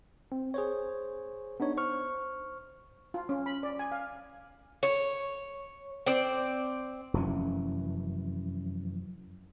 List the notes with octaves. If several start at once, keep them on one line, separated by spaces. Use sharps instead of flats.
C4
G#4 C5 C#5
B3 D4 D#4 C#5
C5 C#6 F6
F4
C#4
B5
D5
G#5
F5
C#5
C4 D5
F1 F#2 E3 C#4